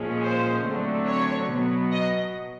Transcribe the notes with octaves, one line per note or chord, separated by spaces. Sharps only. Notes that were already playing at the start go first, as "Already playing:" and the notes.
Already playing: A#2 F3 G#3 C#4
C5
D3 F#3 A3 C4
C#5
B2 F#3 B3
D#5